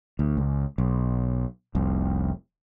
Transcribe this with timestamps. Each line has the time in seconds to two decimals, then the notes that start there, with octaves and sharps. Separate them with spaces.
0.19 D2
0.37 C#2
0.78 B1
1.75 F1 C2